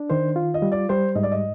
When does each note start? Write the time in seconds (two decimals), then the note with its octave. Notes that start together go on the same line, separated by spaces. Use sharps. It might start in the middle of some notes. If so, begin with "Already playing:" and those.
Already playing: D4
0.09 D#3 C5
0.36 F4
0.54 D#5
0.62 G3
0.72 D5
0.89 G3 C5
1.15 G#2 D#5
1.23 D5
1.32 D#5